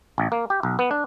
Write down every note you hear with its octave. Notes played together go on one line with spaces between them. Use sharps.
A1
A#3
G4
B1
B3
D4